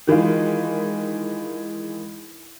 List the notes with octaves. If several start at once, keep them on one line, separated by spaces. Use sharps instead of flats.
D#3 E3 G#3 F4